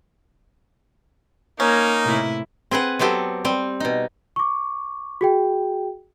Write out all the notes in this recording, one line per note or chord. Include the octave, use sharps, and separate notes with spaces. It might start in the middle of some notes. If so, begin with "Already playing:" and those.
A#3 C#4 D#4
A2 C3 E4
C4 G#4 B4 F#5
F#3 B3 C4 G4 A4
G3 C4
B2 D#4
C#6 D6
F#4 G#4 G5